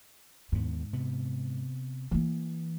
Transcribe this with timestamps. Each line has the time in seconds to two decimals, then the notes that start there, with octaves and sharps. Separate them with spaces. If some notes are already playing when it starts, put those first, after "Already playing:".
0.52 D#2 G#2 B3
0.93 C3 B3
2.11 E3 A#3